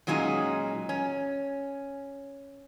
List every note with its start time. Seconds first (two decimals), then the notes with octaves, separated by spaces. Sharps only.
0.07 A#2 F#3 G#3 C#4 D#4
0.89 C#4